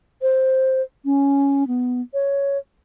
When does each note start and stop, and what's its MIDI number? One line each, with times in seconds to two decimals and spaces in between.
0.22 0.82 72
1.05 1.67 61
1.67 2.02 59
2.14 2.58 73